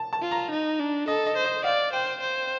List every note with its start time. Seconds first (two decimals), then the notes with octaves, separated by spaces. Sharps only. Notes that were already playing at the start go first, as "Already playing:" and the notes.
Already playing: A5
0.13 A5
0.21 F4
0.32 A#5
0.51 D#4
0.79 D4
1.08 A4 D#5
1.27 D#5
1.36 C5
1.45 D#5
1.64 D5 F5
1.93 C5 G5
2.20 C5